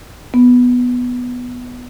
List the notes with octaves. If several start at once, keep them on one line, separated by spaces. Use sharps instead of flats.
B3